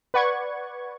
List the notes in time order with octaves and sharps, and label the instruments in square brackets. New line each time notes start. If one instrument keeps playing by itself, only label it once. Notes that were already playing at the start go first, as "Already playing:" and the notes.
[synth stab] B4 D5 F#5 C#6 G#6